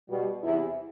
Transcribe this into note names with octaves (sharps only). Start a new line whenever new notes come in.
B2 G3
E2 C3 E3 E4